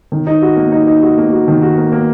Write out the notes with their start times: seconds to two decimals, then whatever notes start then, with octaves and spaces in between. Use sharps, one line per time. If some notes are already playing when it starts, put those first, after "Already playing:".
0.12 D#3
0.27 D#4
0.42 F#4
0.56 A#3
0.72 D#4
0.87 D#4
1.02 F#4
1.18 A#3
1.32 F#4
1.48 D#3
1.62 F#4
1.78 A#3
1.92 A#3